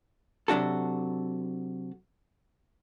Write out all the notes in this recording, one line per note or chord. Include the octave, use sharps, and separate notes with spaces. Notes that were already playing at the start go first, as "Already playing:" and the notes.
C3 F#3 D4 F#4 A4